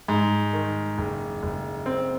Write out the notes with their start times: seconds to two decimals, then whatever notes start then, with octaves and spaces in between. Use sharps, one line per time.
0.08 G#2
0.53 D#3
0.98 F#1
1.43 F#1
1.86 C4